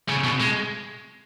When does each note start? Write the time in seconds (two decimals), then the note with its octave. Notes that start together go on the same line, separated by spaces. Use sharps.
0.09 C#3
0.24 B2
0.40 G#3